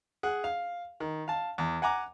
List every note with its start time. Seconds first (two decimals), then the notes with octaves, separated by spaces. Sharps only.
0.23 G#4 F#5
0.44 F5
1.00 D#3
1.28 F5 A5
1.58 E2
1.82 F#5 G#5 A#5 D6